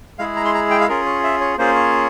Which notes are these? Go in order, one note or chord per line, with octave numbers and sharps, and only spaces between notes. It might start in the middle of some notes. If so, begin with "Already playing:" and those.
G#3 E4 G#4 F5
A#5
C6
A#5
G5
F5
C#4 F4 G#4 A#4
C#5
E5
C#5
A#3 C#4 F4 G#4 C5
C#5